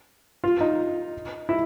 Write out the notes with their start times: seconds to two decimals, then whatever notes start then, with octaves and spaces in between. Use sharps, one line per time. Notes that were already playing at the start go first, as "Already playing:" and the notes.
0.44 F4
0.61 D#4
1.49 E4